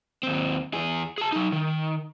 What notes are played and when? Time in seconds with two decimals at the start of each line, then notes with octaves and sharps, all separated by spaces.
0.23 D#2 C4
0.73 E2 G#4
1.18 G#4 A5
1.32 F#3 D#4
1.52 D#3